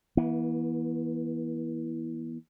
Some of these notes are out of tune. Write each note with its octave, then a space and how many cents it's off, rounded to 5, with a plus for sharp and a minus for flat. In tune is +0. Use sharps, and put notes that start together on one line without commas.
E3 -10 B3 -45